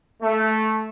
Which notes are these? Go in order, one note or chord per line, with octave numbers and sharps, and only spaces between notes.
A3